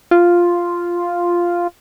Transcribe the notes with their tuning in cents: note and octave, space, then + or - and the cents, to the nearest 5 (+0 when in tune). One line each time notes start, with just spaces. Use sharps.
F4 +0